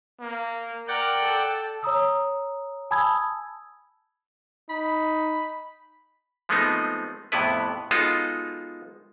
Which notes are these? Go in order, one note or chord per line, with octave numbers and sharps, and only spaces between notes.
A#3
A#4 D5 F#5 G5
A4
C#5 A#5 D#6 E6
G#5 A5 B5 D#6 E6 G#6
D#4 B5
F3 G#3 A3 B3 C4 D#4
F2 A2 C3 B3 E4 B4
G#3 B3 D#4 F4 F#4 A4